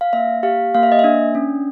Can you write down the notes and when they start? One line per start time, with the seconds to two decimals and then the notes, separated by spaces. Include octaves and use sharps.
0.01 F5
0.13 A#3 E5
0.43 G4 F5
0.75 A#3 F5
0.83 E5
0.92 D#5
0.99 D4 E5
1.35 C#4